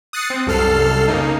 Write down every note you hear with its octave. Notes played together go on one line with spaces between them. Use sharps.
D#6 F#6 A6 C7 C#7
C4
C2 F#2 A4 F6 C7
C#3 A#3 D#4